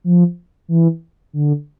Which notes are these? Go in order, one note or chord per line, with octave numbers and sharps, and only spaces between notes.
F3
E3
D3